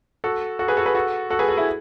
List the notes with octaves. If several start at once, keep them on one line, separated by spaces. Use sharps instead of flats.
F#4 A4
F#4 A4
G#4 B4
F#4 A4
G#4 B4
F#4 A4
F#4 A4
G#4 B4
F#4 A4
E4 G#4